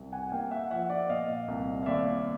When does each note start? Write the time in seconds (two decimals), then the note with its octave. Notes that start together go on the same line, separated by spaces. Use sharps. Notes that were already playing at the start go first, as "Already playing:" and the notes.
Already playing: C2
0.12 F#5 G#5
0.32 A#3 F5 G5
0.51 E5 F#5
0.70 F3 E5 F#5
0.90 D5 E5
1.09 A#2 D#5 F5
1.48 C2
1.83 F5
1.86 D#2 D5 E5